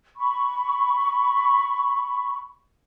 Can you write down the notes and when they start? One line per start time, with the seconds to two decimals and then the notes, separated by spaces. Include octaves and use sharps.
0.17 B5 C#6